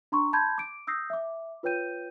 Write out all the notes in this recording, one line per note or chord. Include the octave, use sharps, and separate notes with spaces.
D4 A#5 C6 C#6
A5 B5 C6 G6 G#6
D6 D7
D#6 E6 G6 A#6 C7
E5 D6
F4 B4 C#5 G5 G6 D#7